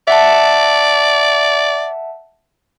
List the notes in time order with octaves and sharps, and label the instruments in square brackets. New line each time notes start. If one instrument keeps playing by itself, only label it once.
[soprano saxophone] D5 [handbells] E5 F#5 A5